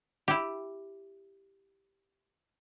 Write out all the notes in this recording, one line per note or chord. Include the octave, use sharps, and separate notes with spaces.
E4 G4